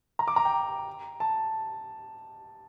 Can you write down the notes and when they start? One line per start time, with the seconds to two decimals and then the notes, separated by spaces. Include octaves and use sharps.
0.19 A#5
0.28 D6
0.36 A#5
0.45 G5
1.20 A5